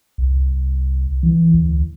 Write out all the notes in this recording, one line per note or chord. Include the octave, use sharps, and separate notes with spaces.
C2
E3
D2